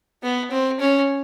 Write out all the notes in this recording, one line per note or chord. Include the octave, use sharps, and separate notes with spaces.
B3
C4
C#4